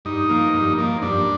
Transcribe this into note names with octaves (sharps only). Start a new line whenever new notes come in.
G2 D#4
F3 A#3
G2
F3 A#3
G2 D4